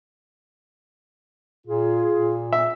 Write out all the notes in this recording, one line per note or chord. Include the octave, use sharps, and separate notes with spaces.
A#2 F4 G#4
A#2
E5